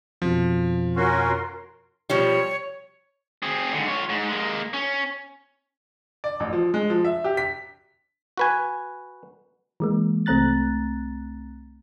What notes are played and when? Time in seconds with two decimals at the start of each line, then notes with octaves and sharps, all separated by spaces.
0.22 F2 B2 F3
0.96 C#4 F4 F#4 A#4 C6
2.10 B2 F3 G3 C#5
3.43 C4 G#4
3.73 G#2 D3
3.88 F4 C#5
4.09 G#2
4.28 G#3 A#3
4.73 C#4
6.24 D5
6.40 A1
6.53 F3
6.74 G#3
6.90 F3
7.05 E5
7.24 G4
7.37 B6
8.38 F#4 B4 G#5
9.80 E3 G#3 A#3
10.26 C2 A3 C4 A#5 F#6 A6